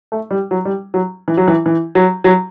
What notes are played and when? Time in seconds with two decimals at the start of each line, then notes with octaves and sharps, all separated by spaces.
0.12 A3
0.31 G3
0.51 F#3
0.65 G3
0.94 F#3
1.28 E3
1.37 F#3
1.48 E3
1.66 E3
1.95 F#3
2.24 F#3